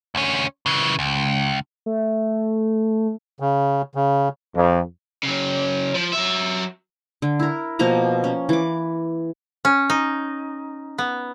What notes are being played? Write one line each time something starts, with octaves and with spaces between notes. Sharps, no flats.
D2 C#4
C#3 E3
C#2
A3
C#3
C#3
F2
C#3 F#3
F3
F#3 E5
D3
E4 A#4
B2 F3 A#3 A#5
C#4
E3 D6
C#4
D#4
B3